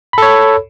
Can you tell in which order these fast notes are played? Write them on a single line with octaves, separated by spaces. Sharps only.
B5 A4 C#5